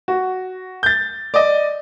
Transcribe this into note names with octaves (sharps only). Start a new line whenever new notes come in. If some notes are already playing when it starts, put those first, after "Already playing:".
F#4
G6 A6
D5 D#5